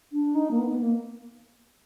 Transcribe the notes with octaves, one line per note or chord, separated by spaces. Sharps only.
D4
D#4
A#3
B3
B3
A#3